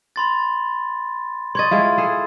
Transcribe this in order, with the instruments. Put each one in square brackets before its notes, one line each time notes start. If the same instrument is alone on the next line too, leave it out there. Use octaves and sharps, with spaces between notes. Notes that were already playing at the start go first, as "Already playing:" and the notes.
[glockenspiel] B5 C6 A6
[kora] C#5 D#5 [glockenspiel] C6 G#6 A6
[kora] G#3 E4 F4
G#4 A4